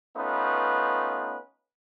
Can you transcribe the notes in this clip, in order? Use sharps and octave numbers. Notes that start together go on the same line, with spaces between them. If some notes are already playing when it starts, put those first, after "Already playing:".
A3 B3 C#4 D#4 F4 B4